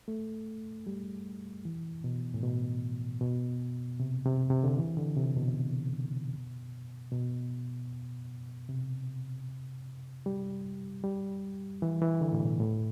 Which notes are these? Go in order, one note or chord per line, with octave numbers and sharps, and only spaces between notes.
A3
G3
E3
B2
A2
B2
B2
C3
C3
C3
D3
E3
D3
C3
B2
B2
C3
G3
G3
E3
E3
D3
A2
B2
A2